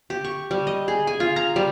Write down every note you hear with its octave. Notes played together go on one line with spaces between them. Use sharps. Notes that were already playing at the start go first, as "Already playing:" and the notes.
G4
C#6
G3
D#5
G#4
G#5
F4
A#5
G3